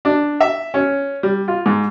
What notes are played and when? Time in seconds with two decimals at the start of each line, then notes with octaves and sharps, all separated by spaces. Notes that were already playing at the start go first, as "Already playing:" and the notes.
0.05 D4
0.40 E5
0.74 C#4
1.23 G3
1.48 F4
1.66 G#2